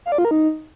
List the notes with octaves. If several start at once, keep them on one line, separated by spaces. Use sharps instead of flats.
F5
D5
F4
A#4
D#4